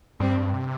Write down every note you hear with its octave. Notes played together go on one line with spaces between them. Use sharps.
G2 G3 C4
C3